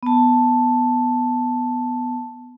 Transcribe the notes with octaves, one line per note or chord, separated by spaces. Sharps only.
B3 A5